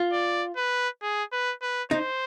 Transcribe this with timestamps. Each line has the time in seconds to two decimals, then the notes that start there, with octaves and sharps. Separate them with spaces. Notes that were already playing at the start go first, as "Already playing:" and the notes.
Already playing: F4
0.12 D5
0.57 B4
1.02 G#4
1.32 B4
1.62 B4
1.91 D#4 C5